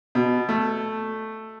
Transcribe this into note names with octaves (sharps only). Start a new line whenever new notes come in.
B2
A3